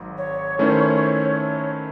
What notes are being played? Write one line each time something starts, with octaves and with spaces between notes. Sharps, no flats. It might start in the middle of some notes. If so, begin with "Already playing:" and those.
Already playing: G#1 G#2 F#3
C#5
D#3 A3 C#4 E4 C5